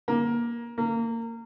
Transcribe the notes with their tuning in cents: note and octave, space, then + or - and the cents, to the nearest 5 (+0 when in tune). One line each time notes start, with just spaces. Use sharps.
A#3 +15
A#3 -25